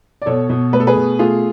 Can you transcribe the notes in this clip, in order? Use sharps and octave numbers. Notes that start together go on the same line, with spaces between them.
D5
B2 A4 C#5
B2
A3 B4
A4
G#4 B4
B2
A3 F4 G#4